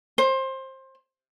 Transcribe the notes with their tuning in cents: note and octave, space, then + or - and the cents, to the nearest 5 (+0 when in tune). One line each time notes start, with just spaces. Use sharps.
C5 +20